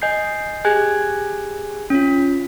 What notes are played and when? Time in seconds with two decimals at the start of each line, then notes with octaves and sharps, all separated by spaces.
0.02 D#5 G#5 G6 C7
0.64 G4 G#4 G#5 F#6 G#6
1.90 C#4 F4